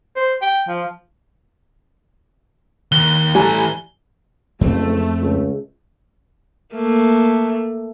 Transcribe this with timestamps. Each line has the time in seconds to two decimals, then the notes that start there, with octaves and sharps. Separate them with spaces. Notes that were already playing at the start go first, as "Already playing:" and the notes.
0.16 C5
0.42 G5
0.67 F3
2.92 D#2 F#6 G7
3.35 E3 G3 A3 G#5 A#5
4.61 F#1 F2 A3 C4
5.21 C#2
6.75 A3 A#3